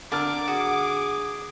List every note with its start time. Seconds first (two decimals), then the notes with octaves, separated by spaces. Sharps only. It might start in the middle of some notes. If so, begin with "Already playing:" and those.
0.12 D3 A#4 D5 A5 D6 F6
0.48 F#4 G#4